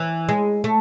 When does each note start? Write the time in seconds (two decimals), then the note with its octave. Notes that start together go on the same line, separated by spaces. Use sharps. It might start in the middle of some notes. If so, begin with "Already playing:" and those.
Already playing: E3
0.29 G#3
0.64 A3